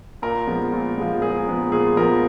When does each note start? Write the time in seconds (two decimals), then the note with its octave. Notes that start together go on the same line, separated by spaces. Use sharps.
0.22 A#2 A#4
0.47 F3 G#3 B3
0.72 A#2
0.98 F3 G#3 B3
1.22 A#2 G#4
1.47 F3 G#3 B3
1.72 A#2 G#4
1.97 F3 G#3 B3 A#4